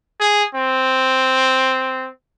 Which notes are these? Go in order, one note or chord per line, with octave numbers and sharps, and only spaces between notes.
G#4
C4